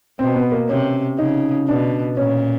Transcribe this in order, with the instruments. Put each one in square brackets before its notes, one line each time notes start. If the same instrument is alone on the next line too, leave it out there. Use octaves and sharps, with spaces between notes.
[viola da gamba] B2 [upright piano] C4
[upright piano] B3
A#3
[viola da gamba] C3 [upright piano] C#4
[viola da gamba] C#3 [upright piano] D#4
[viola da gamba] B2 [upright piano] D4
[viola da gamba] A#2 [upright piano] C#4